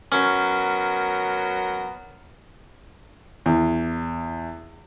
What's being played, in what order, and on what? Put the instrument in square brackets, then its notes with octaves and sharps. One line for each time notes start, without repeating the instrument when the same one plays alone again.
[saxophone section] F#3 B3 A#4 [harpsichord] C#4
[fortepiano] E2